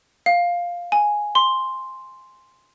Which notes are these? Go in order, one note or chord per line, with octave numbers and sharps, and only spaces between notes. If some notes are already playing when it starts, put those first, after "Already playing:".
F5
G#5
C6